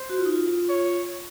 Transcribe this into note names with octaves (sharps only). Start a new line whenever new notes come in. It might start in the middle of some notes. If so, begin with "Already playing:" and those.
Already playing: C5
F#4
F4
D#4
F4
C#5